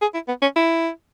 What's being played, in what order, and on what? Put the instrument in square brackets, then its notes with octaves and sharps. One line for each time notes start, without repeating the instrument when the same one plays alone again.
[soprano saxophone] G#4
E4
B3
C#4
E4